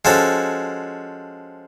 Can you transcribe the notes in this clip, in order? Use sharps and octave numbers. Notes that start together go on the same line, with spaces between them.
F3 G#3 C#4 F#4 A4